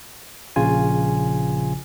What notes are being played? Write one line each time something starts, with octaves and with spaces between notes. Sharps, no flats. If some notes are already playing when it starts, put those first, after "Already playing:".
A#1 C#3 F4 G#5